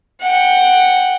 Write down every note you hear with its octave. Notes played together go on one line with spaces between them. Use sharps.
F#5 G5